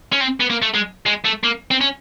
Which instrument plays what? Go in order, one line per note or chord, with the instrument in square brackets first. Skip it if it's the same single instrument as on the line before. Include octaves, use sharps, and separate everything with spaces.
[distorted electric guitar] C#4
C4
B3
A#3
A3
G#3
G#3
A3
A#3
C4
C#4